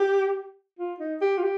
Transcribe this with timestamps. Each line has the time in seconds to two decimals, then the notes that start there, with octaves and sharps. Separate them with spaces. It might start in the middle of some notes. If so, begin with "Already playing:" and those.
Already playing: G4
0.79 F4
1.00 D#4
1.21 G4
1.38 F4
1.43 G4